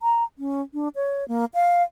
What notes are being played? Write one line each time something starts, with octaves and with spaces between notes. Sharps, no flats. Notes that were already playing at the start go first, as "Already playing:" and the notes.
A#5
C#4
D4
C#5
A#3
F5